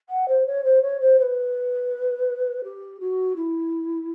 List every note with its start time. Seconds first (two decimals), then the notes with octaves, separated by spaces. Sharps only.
0.09 F#5
0.28 C5
0.46 C#5
0.64 C5
0.82 C#5
1.00 C5
1.19 C5
1.22 B4
2.63 G4
3.00 F#4
3.36 E4